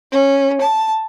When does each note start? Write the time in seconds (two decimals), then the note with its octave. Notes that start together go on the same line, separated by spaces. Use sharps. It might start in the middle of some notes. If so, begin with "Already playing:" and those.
0.13 C#4
0.61 A5